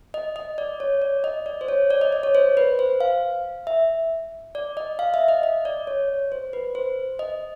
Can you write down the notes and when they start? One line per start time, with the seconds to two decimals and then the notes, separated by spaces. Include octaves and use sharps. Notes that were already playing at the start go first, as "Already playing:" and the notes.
0.14 D#5
0.36 D#5
0.58 D5
0.80 C#5
1.02 D5
1.24 D#5
1.46 D5
1.61 C5
1.68 C#5
1.91 D5
2.01 D#5
2.12 D5
2.23 C#5
2.35 C5
2.57 B4
2.79 C5
3.01 F5
3.67 E5
4.55 D5
4.77 D#5
4.99 F5
5.14 E5
5.28 D#5
5.43 D#5
5.65 D5
5.87 C#5
6.32 C5
6.53 B4
6.75 C5
7.19 D#5